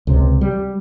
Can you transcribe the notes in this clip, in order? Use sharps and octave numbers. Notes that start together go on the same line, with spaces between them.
C#2 C3
G3